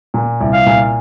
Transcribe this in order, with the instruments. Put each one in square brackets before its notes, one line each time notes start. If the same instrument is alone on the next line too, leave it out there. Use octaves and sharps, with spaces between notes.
[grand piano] A#2
C2
[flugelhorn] F5
[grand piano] A#2